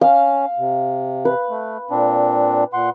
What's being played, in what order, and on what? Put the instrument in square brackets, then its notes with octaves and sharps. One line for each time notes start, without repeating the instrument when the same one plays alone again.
[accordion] C#4 [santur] F5
[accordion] C3
[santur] B4
[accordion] A3
A#2 C4 D4
A#2 F#5 C6